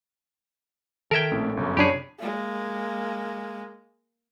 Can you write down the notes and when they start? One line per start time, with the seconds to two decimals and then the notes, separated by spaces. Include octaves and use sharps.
1.11 D#3 A4 A#4 E5 G5 G#6 D7
1.31 A#1 A2 A3 C4 C#4
1.57 G1 F#2 C3 C#4
1.77 F#2 D4 G4 G#4 C#5 B5
2.19 G#3 A#3